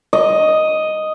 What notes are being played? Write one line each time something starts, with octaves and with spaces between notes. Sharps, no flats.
D#5